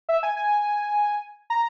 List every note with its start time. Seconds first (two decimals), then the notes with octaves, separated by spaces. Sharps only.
0.09 E5
0.23 G#5
0.36 G#5
1.50 A#5